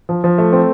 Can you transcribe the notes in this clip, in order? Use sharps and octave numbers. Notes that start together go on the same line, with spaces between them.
F3
F3
A3
C4